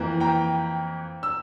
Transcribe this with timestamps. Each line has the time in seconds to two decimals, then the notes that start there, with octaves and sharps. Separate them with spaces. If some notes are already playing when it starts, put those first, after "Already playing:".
Already playing: F2 E3 A#3
0.20 G5 A#5
1.23 E6